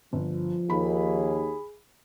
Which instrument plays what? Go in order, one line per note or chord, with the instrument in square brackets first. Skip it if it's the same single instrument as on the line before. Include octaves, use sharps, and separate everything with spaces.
[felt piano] G1 [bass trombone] F3
[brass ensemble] D#2 [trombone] G#4 [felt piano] B5